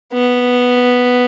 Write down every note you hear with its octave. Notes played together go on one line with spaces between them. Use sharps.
B3